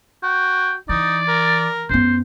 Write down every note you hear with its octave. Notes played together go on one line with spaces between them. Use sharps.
F#4 G5
E3 D#4 D5
A#4
F#2 B3 C5